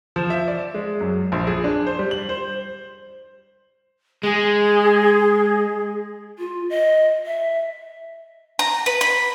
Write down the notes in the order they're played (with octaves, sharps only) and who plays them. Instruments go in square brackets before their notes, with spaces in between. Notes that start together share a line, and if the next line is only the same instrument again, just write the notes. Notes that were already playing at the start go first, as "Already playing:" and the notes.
[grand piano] F3
E5
D5
G#3
F#2
A#1
G#4
D4
C5
G3
F#7
C5
[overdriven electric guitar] G#3 [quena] G#4
[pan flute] F4
D#5
E5
[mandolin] A#5
B4
B5